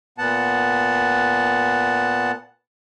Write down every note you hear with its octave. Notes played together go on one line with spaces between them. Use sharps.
A#2 B3 F#5 A5